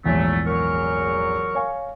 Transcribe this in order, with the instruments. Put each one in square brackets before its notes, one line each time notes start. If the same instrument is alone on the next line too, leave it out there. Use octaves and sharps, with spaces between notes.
[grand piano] A#1 E2 G#2 [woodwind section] F#3 A3
[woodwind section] F#3 A#4 C#6
[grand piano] C#5 F5 G#5